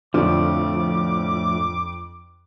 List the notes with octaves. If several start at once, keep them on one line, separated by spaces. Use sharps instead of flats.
F2 A2 D3 F3 D6